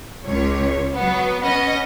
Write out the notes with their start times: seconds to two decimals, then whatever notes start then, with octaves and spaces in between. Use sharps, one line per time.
0.25 C#2 C#5
0.93 F#3 B3
1.41 B3 C#4 D#5